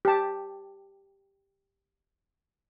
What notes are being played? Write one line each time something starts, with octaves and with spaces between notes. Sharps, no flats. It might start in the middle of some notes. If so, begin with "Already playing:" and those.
G4 A5